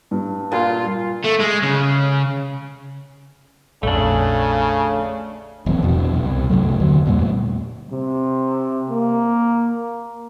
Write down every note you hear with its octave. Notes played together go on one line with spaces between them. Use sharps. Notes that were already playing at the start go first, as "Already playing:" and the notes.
G2
A#2 F4
A3
G#3
C#3
A#1 F2 C#3 A3 D4
D#1 A1 F3 C4
E2 G2 B2
C2
F#2 C3 F#3 A3
D#2 D3
E2 A#2 G3 A3
C3
A#3